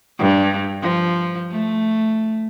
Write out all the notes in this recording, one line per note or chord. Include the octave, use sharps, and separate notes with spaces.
G2
F3
A3